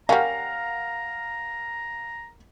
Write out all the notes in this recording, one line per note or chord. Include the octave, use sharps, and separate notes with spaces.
G3 C#4 A#4 F5 F#5 A#5 F6